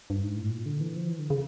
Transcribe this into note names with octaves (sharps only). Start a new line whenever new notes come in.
G2
G#2
A2
A#2
D3
E3
F3
E3
D3
C#3